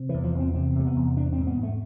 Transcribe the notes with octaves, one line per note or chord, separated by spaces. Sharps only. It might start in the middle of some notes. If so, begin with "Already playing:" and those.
Already playing: C3
E2 E3
F3
E2
C4
C3 C4
C3 A3
B3
E2
G#2 D4
C4
G#2
B3
G#2
A3